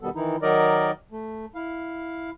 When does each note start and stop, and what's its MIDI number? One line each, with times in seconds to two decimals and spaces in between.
0.01 0.10 47
0.01 0.10 51
0.01 0.10 55
0.01 0.10 59
0.01 0.10 69
0.15 0.36 51
0.15 0.36 52
0.15 0.36 63
0.15 0.36 64
0.42 0.91 51
0.42 0.91 54
0.42 0.91 63
0.42 0.91 70
0.42 0.91 74
0.42 0.91 75
1.12 1.46 57
1.55 2.30 64
1.55 2.30 77